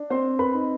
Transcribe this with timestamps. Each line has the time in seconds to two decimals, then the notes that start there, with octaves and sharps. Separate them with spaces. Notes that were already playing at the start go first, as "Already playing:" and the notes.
Already playing: D4
0.10 C4 C5 C6
0.39 B4 B5
0.54 D#4